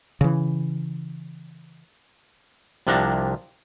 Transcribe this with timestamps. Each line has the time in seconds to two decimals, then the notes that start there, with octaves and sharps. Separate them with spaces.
0.21 C#3 E3
2.87 C2 C3 F3 D4 F#5 A#5